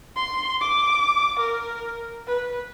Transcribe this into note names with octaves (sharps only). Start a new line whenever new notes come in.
C6
D6
A#4
B4